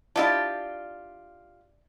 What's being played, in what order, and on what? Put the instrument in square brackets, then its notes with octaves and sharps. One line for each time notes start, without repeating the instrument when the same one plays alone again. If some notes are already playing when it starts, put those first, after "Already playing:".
[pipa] D4 E4 [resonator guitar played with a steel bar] F4 G4 [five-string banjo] D5 D#5 A5